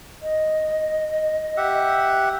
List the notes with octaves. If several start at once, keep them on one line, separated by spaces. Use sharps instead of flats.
D#5
G4 E5 F#5